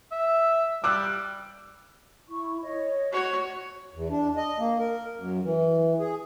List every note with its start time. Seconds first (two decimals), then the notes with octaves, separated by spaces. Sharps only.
0.12 E5
0.84 G3 D6 E6 F#6
2.29 E4 C#6
2.62 C#5 D#5
3.12 F#4 C#5
3.94 E2
4.11 D4
4.36 D#5
4.59 A#3
4.79 A#4
5.17 F#2
5.44 E3
6.00 G#4